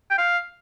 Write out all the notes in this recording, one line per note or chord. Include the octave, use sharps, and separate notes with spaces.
G5
F5